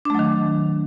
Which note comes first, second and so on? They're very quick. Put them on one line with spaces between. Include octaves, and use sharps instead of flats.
D4 A3 F#3 D#3